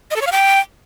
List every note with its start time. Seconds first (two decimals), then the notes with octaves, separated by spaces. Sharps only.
0.11 D#5
0.16 A4
0.21 C#5
0.27 F5
0.32 G5